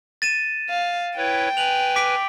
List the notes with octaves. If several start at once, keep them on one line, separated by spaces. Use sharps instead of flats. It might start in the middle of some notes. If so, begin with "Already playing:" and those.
A6 D#7 E7
F5
E4 B4 C#5 G5
B4 G#5 F7 F#7
D6 B6 D7